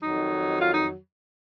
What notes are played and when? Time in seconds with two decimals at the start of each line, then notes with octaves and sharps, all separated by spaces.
0.02 F2 D#3 F#3 D#4
0.61 F4
0.73 D#4